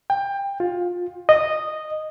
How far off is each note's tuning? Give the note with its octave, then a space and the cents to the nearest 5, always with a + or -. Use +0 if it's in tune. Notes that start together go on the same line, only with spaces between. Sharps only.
G5 +20
F4 +20
D#5 -10